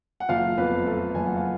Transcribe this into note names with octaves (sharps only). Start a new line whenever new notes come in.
F#5
F#1 F4 F5
F2 B3 B4
F3 A3 A4
F#1 G#5
F#5
F5